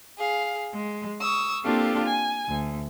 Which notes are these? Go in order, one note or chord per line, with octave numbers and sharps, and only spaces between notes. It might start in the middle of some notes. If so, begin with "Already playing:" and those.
G#4 F5
G#3
C#6 D#6 E6
A#3 C4 D4 F4 G4 A4
G#5
D2